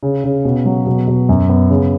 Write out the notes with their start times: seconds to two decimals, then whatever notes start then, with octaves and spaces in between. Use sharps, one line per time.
0.03 C#3
0.24 C#3
0.45 B2
0.65 F#3
0.86 B2
1.07 B2
1.29 F#2
1.49 B3
1.70 C#3